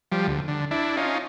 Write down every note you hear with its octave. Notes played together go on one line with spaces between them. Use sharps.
F3 G3
D2
D3
D4 E4
C#4 D#4 F4